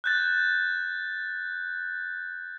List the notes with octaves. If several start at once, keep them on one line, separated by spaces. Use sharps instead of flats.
F#6 G6 A6